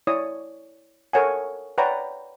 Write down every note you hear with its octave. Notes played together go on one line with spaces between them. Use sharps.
E4 C#5 D5 D#6
A4 A#4 C#5 F#5 G#5
B4 C#5 D5 F#5 G5 A#5